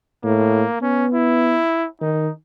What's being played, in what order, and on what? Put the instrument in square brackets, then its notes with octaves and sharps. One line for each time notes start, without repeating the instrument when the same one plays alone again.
[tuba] A2 [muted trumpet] A#3
[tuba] B3 [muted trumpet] C#4
[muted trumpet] E4
[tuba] D#3 [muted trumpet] D#4